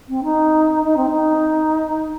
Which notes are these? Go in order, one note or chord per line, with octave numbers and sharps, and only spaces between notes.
C4
D#4
D#4
C4
D#4